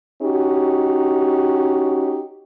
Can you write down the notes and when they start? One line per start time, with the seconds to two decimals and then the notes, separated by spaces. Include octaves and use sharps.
0.22 C#4 D#4 F#4 G4